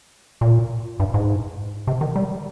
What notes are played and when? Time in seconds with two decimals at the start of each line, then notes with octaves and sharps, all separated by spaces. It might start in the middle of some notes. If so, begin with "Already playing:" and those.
0.41 A#2
1.00 G2
1.14 G#2
1.87 C3
2.01 D#3
2.16 G3